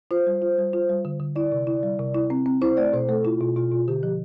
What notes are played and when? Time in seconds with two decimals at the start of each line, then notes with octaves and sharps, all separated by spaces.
0.11 F4 C5
0.26 G3
0.42 F4
0.58 G3
0.73 F4
0.89 G3
1.05 D3
1.20 D3
1.36 E4 D5
1.52 C3
1.67 E4
1.83 G3
1.99 C3
2.15 E4
2.30 C4
2.46 C4
2.62 E4 C5
2.77 A3 D5
2.93 B2 C5
3.08 A3 A4
3.25 E4 F4
3.41 B2
3.56 B2 F4
3.72 B2
3.88 D3 G4
4.03 F3